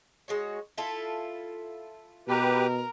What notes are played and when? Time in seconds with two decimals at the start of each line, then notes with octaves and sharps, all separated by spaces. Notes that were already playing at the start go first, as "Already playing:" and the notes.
0.28 G#3 F#4 C#5
0.78 E4 F4 A4
2.28 B2 G4 A#4 B4